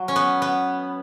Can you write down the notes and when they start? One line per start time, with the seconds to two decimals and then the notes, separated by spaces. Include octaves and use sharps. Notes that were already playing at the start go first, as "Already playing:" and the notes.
Already playing: F#3
0.08 C#4
0.16 B3
0.42 B3